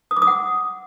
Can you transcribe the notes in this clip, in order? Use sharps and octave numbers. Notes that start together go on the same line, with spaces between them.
D#6
D6
D#6
F#5